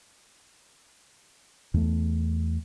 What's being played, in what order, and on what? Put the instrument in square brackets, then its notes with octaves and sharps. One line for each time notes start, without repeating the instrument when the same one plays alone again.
[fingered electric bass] E2 A3